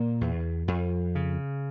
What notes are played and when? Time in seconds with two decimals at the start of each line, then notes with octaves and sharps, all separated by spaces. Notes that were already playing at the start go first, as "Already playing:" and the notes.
Already playing: A#2 A#3
0.21 E2
0.68 F2
1.15 C#3